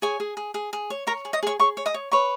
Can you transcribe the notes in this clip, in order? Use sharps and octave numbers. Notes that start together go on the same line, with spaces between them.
G#4 C#5 G#5
G#4
G#4
G#4
G#4
C#5
A#4 C#5 A#5
G#4
D#5 D#6
G#4 C#5 C#6
G#4 C#5 C#6
C#5
D#5 D#6
C#5
B4 C#5 C#6